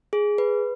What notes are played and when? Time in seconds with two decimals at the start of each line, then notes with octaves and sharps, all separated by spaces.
0.13 G#4
0.38 B4